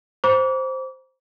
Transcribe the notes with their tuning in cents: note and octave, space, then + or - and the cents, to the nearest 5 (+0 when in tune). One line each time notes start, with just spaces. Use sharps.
C5 +0 A#5 +40 D6 -35